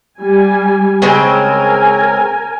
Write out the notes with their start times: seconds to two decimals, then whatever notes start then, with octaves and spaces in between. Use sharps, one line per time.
0.20 G3 G#5
1.02 C#3 G#3 C4 A#4 G#5